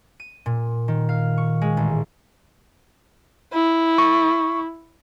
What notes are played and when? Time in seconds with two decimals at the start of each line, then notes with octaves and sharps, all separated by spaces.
0.20 D#7
0.46 A#2
0.88 D#3
1.09 F5
1.38 C#6
1.62 G#3
1.77 A1
3.53 E4
3.98 C#6